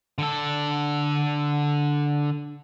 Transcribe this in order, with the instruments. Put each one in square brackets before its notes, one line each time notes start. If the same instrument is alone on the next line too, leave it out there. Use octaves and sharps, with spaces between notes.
[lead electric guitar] D3 A4